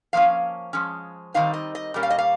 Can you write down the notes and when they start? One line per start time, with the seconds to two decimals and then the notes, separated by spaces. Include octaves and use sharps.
0.13 F3 A#3 C#4 F5
0.73 F3 G#3 C#4
1.34 D#3 G3 C4 D#4 F5
1.54 D#5
1.75 D#5
1.94 A#2 G3 A#3 C#4
2.03 F5
2.10 D#5
2.18 F5